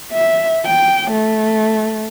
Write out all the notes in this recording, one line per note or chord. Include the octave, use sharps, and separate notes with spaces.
E5
G5
A3